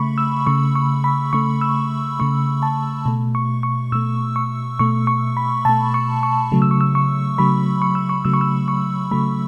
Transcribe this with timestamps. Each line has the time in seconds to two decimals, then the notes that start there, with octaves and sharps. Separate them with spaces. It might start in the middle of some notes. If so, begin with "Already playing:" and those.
Already playing: C#3 A3 B5 C#6
0.18 E6
0.46 C#3 A3 C#6
0.75 C#6
1.04 B5
1.33 C#3 A3 C#6
1.61 E6
2.19 C#3 A3 C#6
2.62 A5
3.06 B2 A3
3.35 C#6
3.63 C#6
3.92 B2 A3 E6
4.36 C#6
4.79 B2 A3 C#6
5.07 C#6
5.37 B5
5.65 B2 A3 A5
5.94 C#6
6.23 C#6
6.52 C#3 F#3 A3
6.62 E6
6.71 C#6
6.81 E6
6.95 C#6
7.38 C#3 F#3 A3 B5
7.82 C#6
7.95 E6
8.09 C#6
8.25 C#3 F#3 A3 E6
8.34 C#6
8.41 E6
8.68 C#6
9.11 C#3 F#3 A3 B5